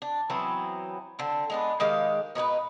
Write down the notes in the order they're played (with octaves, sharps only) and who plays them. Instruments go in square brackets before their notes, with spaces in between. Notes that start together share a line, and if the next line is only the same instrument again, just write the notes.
[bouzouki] D4
E3 F#3 B3 C4
D3 C4
G#3 B3 D4
D#3 G#3 G4 F5
B2 D#4 G#4 B4